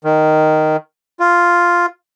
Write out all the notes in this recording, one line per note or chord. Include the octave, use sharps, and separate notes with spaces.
D#3
F4